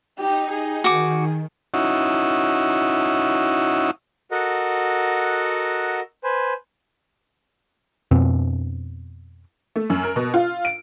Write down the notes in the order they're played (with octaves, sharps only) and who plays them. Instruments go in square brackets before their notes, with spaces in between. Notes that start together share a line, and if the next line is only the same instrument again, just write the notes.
[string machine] D#4 [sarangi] G4
[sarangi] G#4
[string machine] D#3 [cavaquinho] F#4 D6
[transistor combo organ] C#4 D#4 E4 F#4
[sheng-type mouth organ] F#4 A4 A#4 D#5 F#5
B4 C5 G#5
[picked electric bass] F2 B2 C4
[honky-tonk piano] A3
F#2
A#4
B2
F4
D7